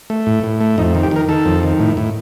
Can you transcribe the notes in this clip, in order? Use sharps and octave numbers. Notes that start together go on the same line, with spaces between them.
A3
A2
A2
A3
F2 D#4
D#3
G4
D#3 A#4
D#3 A4
F2
D#3
A2
A2